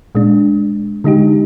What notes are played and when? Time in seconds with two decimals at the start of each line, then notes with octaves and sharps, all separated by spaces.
0.15 A#2 G#3 D4
1.04 D3 G#3 D#4 G4